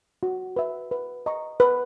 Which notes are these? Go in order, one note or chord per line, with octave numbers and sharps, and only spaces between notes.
F#4
B4 E5
B4
D#5 A#5 C#6
B4